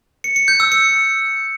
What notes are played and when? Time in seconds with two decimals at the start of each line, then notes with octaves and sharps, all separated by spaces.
0.24 C#7
0.36 C#7
0.48 G6
0.60 E6
0.72 C#7